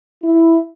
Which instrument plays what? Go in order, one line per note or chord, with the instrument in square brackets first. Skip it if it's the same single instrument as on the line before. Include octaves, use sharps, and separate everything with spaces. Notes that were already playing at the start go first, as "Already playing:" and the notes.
[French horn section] E4